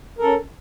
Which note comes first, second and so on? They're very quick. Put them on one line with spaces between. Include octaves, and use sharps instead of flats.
A#4 A4 C#4